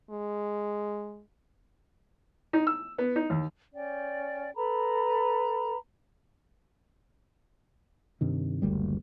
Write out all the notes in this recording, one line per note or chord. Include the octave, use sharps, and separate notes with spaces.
G#3
D#4
E6
B3
D#4
D#2
C#4 D5 G5
A4 B4 A#5 B5
G2 C3 D#3
F#1 D2 G3